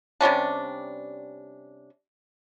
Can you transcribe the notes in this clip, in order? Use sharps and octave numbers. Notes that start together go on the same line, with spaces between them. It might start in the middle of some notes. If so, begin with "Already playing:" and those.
C3 G3 C#4 D4